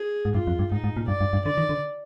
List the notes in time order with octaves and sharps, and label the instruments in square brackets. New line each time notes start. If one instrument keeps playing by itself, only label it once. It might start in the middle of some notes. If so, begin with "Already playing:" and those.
Already playing: [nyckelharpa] G#4
[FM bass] G#2
[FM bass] G2 [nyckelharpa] F4
[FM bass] F2
G2
[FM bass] G#2 [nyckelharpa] D#4
[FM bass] G#2
A#2
[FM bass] G2 [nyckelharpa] D5
[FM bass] G2
G2
[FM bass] D3 [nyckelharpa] D5
[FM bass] D#3
D3